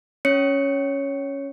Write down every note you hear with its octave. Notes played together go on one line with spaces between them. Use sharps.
C#4 C#5 C#7